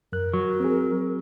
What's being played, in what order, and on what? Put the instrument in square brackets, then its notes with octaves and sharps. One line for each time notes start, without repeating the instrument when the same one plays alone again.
[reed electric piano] F#2 F#6 [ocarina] A#4
[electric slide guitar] F#3 [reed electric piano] C#6
[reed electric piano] C4 G#4